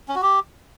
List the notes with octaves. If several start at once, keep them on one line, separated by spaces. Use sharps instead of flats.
C#4
F#4
G4